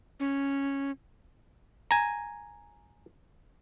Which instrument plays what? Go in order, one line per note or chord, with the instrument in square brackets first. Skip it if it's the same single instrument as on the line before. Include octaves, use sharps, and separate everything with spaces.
[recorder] C#4
[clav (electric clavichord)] G#5 A#5